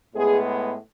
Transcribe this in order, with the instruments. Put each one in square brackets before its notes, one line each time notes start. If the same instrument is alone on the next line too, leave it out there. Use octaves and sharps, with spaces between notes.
[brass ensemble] A2 G#3 B3 G#4